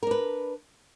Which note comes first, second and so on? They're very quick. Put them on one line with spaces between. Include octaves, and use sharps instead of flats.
A#4 D4 B4